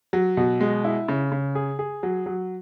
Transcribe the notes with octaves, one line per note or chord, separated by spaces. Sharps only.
F#3
B2
G#3
E4
C#3
C#3
G#4
G#4
F#3
F#3